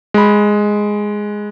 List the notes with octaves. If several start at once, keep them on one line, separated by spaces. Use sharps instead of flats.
G#3 B5